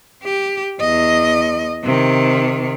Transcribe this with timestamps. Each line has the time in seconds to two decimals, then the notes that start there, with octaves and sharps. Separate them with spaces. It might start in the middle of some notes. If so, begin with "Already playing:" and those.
0.24 G4
0.80 E2 D#5
1.84 C3 D#3